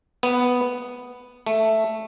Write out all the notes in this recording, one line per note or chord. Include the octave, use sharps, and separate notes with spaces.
B3
A3